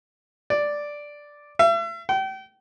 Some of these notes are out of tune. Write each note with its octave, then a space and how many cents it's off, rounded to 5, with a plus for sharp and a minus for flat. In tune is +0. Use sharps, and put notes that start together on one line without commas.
D5 +0
E5 +40
G5 -35